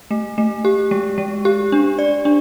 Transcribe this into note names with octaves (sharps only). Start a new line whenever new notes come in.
A3
A3
G4
G#3
G#3
G4
D4
D5
D4